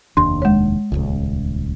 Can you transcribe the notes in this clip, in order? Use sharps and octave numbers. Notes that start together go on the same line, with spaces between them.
F1 D#2 D4 C6
G#3 C#5
D#1 G#1 C#2